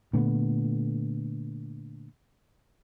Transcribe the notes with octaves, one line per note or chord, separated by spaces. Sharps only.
A#2 D3 A3 B3